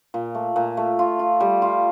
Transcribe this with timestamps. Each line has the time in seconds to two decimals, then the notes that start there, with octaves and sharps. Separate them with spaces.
0.14 A#2
0.35 A3
0.56 A#2
0.77 A3
0.99 F4
1.19 F4
1.40 G3
1.62 F4